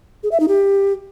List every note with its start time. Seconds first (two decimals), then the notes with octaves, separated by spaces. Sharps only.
0.23 G#4
0.32 E5
0.40 D#4
0.48 G4